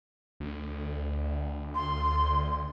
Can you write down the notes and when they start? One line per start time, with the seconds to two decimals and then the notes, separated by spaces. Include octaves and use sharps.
0.40 D2
1.75 C6